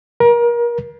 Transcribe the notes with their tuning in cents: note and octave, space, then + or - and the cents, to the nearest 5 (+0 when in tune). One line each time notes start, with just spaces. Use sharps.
A#4 +30